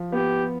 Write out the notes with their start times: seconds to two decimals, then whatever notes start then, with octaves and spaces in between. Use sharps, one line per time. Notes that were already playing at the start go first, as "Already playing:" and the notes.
Already playing: F3
0.12 B3 G4